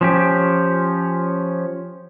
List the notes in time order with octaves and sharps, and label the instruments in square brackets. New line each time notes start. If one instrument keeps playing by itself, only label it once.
[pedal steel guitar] F3 C#4 G4